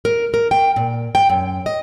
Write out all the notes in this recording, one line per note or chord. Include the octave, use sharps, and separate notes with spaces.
A#4
A#4
G5
A#2
G5
F#2
D#5